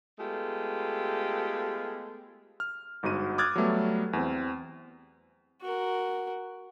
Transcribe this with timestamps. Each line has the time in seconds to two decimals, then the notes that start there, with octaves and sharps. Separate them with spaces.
0.19 G#3 A3 B3 F4 G4
2.60 F6
3.03 G1 G#2 F#4 D#7
3.38 D6 D#6 F6 F#6 G#6 A6
3.56 F#3 G3 A3 B3
4.13 E2 C4
5.61 F#4 A#4